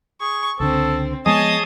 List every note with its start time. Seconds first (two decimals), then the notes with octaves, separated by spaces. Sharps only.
0.21 G#4 C#6
0.60 C#2 D3 C4 A4
1.26 F3 G#3 B3 G#4 C#5 D#5 A5 D#6